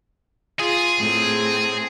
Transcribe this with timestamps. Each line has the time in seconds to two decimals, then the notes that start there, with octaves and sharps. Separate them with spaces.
0.60 F4 G#4
0.98 A2 C4